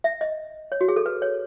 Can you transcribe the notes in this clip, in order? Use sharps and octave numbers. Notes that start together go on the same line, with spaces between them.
E5
D#5
C#5
F#4
G#4
A4
B4
C#5